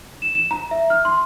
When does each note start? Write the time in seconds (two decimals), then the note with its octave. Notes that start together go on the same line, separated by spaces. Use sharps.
0.22 E7
0.35 E7
0.51 A#5
0.71 E5
0.90 F6
1.05 C6